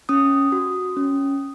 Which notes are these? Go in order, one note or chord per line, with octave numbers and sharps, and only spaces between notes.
C#4 D#6
F#4
C#4